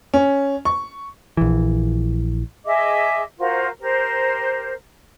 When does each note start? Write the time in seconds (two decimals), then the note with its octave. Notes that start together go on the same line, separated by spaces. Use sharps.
0.14 C#4
0.65 C#6
1.37 A#1 E3
2.65 G#4 D#5 E5 D6
3.38 F4 F#4 A#4 C5
3.79 G4 A#4 C5